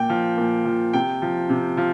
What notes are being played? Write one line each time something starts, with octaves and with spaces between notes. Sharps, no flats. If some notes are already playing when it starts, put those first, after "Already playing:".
Already playing: A#2 G5
F3
A#2
F3
C3 G5
F3
C3
F3